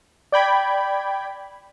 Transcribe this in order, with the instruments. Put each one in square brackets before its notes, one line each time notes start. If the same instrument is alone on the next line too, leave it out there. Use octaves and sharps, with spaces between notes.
[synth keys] D5 G5 B5 G#6